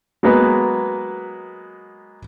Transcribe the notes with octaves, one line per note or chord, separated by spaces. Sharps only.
F#3 G#3 A#3 B3 B4